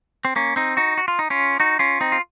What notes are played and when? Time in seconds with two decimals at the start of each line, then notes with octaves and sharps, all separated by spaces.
0.25 C4
0.36 A#3 C#4
0.56 C4 D#4
0.77 D#4 F#4
0.97 F#4
1.08 F4
1.19 D#4
1.30 C#4 F4
1.60 D#4 F#4
1.79 C#4 F4
2.01 C4 D#4
2.12 F4